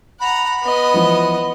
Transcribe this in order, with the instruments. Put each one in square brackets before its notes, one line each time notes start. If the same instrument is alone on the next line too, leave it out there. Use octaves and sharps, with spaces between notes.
[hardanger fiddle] F#5 A#5 [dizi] B5
[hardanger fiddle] B3 D#5
[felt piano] E3 F3